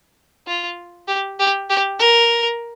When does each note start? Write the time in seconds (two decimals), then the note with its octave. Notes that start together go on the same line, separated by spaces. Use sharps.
0.47 F4
1.08 G4
1.39 G4
1.69 G4
1.99 A#4